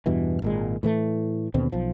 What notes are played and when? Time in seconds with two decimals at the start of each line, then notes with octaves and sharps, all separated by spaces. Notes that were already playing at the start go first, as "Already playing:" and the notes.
0.06 E2 G2 B2 E3
0.42 G#1 A#2 G#3
0.83 A2 E3 A3
1.54 D#2 B2 D3 C4
1.72 B1 F3